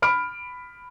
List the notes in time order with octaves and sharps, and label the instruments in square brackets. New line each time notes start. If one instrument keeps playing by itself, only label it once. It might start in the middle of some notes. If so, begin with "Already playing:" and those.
[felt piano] B5 F6 D7